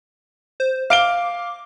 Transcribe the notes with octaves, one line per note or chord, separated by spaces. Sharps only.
C5
F5 D6 D7 G7